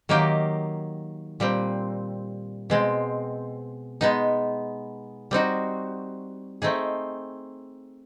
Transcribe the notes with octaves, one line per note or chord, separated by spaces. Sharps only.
D#3 F#3 A#3 D#4 G4
A#2 G3 C4
B2 G#3 C4
G#3 B3 D#4
G3 C4 D#4 F#4
A3 C4 D#4 G#4